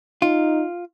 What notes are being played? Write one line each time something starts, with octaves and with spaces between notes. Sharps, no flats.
D#4 F4